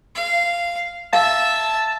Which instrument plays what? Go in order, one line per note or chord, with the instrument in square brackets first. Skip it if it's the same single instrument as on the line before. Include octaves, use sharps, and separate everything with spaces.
[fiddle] F5
[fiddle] E5 [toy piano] F5 [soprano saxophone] A5